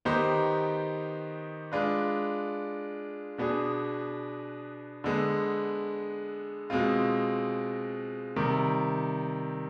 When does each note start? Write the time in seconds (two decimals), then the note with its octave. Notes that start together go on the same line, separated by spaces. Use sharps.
0.05 D#3 B3 D#4 G4 C5
1.72 G#3 D4 F4 B4
3.38 B2 B3 D4 G#4
5.04 D3 G#3 B3
6.70 B2 G#3 C4 F4
8.36 C3 D#3 G3